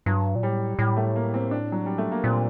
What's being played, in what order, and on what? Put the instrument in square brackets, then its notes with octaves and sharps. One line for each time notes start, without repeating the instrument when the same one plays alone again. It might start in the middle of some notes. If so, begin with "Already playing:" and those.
[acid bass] G2 [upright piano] F#3
[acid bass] A#2
[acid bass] A2 [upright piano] G3
[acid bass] A2 [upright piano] G3
[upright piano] A3
A#3
C4
D4
F#3
G3
A3
A#3
[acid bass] A#2 [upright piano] C4